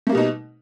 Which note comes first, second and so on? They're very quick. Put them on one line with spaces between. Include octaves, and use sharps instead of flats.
A3 A#3 G3 B2 D#4